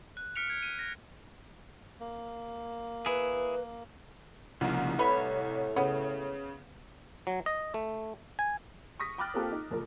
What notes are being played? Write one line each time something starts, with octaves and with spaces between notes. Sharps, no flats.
F#6
F6 B6 C#7 D7 F7
G#6
D#7
A#6
A#3
E4 G#4 B4
C2 C#3 F3 A#3
A2 B4 C#5 B5
C#3 B3
F#3
D#5
A3
G#5
C#6 D#6 A#6 B6
G5 B5 D6 F6 F#6 A6
A#3 C4 F4 G4 A4
D#4
F#1 F3 A#4